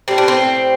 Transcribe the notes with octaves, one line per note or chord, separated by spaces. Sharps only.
A2 G3 C4
D4
C4